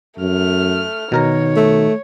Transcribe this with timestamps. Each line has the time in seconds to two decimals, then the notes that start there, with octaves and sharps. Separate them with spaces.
0.19 F#2 A3 F6
1.12 B2 D#3 A#4 C#5 A#5
1.56 A3